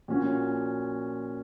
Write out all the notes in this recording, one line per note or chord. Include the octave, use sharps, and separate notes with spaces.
A#2 F3 A#3 C#4 F#4